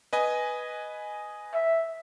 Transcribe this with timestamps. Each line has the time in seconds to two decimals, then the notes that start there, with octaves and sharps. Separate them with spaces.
0.13 B4 D#5 G#5
1.54 E5